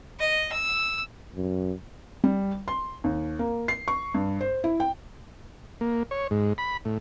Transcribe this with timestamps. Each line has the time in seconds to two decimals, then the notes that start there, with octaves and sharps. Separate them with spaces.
0.19 D#5
0.52 E6
1.36 F#2
2.24 G3
2.68 C6
3.04 D#2
3.39 A#3
3.68 C7
3.88 C#6
4.15 G2
4.41 C5
4.64 E4
4.80 G5
5.81 A#3
6.11 C#5
6.31 G#2
6.58 B5
6.85 A2